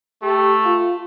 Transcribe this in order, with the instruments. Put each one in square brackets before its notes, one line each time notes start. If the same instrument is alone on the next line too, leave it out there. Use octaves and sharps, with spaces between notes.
[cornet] A3 [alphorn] G4
[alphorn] F4